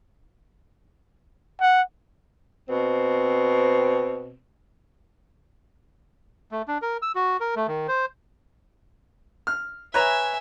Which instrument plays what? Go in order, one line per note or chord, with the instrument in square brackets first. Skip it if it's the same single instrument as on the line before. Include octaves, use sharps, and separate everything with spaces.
[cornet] F#5
[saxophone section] B2 C4
[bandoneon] A3
D4
A#4
E6
F#4
A#4
A3
D#3
C5
[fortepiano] F6
[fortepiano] B4 C#5 A#5 [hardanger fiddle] E5 G#5